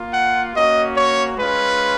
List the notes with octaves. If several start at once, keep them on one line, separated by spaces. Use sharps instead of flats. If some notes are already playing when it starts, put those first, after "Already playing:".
Already playing: A#3 F4
F#5
A#3 C#4 F#4 D#5
C#5
G#3 C#4 F4 B4